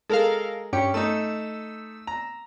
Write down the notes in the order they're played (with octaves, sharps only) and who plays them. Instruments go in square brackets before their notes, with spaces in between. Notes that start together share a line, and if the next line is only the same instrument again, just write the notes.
[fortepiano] G#3 [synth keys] A4 A#4 F5
[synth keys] G2 C#4 C#7 [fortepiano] G4 G5
[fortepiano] A3 D#4 [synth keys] E6
[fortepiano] A#5